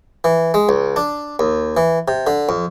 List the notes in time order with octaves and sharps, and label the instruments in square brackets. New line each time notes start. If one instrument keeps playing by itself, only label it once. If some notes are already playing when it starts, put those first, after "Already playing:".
[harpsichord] E3
G#3
C#2
D4
D#2
E3
C3
D3
F2